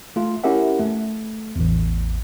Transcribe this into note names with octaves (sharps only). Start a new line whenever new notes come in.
A3 F4
C#4 E4 G4 A#4 E5 F#5
A3
A1 E2